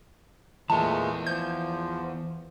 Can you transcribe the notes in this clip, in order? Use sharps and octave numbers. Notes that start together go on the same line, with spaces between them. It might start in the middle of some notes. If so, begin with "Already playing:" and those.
A#2 E3 G#3 A3 B3 A5
F3 G6